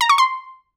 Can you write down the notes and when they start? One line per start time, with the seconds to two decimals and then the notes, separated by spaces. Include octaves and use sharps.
0.01 A#5
0.09 C#6
0.18 C6